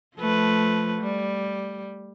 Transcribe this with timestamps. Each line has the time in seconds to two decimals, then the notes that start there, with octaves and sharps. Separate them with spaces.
0.17 F3 A3 B4
1.02 G3